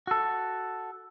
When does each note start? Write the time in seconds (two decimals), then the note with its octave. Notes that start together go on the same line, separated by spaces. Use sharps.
0.07 F#4 A4